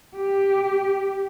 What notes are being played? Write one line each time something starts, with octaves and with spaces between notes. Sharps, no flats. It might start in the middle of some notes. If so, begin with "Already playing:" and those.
G4